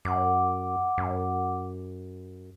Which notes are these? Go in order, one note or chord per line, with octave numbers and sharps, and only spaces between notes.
F#2 F#5 D6
F#2